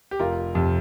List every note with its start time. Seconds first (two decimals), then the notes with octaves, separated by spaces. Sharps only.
0.11 G4
0.19 F1 F4 A#4
0.55 F2 C3